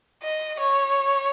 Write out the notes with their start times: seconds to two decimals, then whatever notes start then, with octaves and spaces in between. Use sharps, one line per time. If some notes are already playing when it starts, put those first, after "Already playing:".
0.23 D#5
0.59 C#5